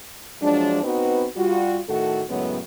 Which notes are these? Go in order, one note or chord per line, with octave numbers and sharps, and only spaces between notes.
F3 F#3 G#3 D4
B3 C4 D#4 F#4 B4
G3 F4 F#4
A2 D#3 A3 F#4 A4
F#2 A2 C#3 F#3 G#3 B3